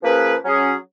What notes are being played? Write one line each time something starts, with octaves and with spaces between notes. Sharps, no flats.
F3 A#3 C#4 G#4 B4
F#3 C#4 G#4